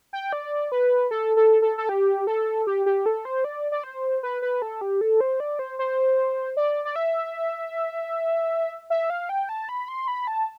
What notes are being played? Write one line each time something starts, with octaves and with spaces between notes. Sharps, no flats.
G5
D5
B4
A4
A4
A4
A4
G4
A4
G4
G4
A4
C5
D5
D5
C5
B4
B4
A4
G4
A4
C5
D5
C5
C5
D5
D5
E5
E5
F5
G5
A5
B5
C6
B5
A5